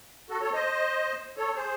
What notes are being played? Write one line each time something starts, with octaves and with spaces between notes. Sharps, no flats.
F#4 A4
A4 C#5
C5 D#5
A4 C#5
G#4 C5